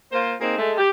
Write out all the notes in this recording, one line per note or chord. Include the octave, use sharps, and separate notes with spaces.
A#3 F4 C5
A#3 C4 D#4 G#4
G#3 A3
G4